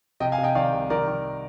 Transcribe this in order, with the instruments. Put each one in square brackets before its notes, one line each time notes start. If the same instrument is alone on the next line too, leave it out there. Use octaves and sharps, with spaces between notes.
[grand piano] C3 D#5 G5
F5 G#5
C3
D#5 G5
D#3 D5 F5
C2
D#3 A#4 D5
D#3